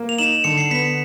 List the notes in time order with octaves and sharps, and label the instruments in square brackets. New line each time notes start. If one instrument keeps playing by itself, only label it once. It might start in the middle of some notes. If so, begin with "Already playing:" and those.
Already playing: [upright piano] A#3
[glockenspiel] F7
[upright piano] D#4 [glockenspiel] E7 F#7
[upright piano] D3 [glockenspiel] C#7
[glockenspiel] C7
[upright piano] B3 [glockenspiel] B6 C#7